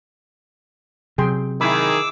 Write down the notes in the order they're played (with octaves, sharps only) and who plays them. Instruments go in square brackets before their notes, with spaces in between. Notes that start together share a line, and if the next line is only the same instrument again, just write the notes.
[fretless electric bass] C3 F#3 [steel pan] G#4 G5 C6
[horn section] D#3 G#4 [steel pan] E4 B5 [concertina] D6 E6